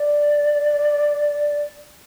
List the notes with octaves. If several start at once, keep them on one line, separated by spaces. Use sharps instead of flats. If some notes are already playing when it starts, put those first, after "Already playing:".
Already playing: D5